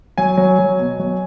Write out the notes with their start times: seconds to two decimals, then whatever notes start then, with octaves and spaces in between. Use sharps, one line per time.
0.18 F#3 G#5
0.37 F#3
0.59 F#3
0.79 B2
0.99 F#3